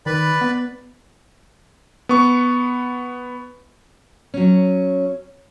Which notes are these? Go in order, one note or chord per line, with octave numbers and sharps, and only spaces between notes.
D#3 B4 D5 B5
B3
B3 C#6
F#3 C#4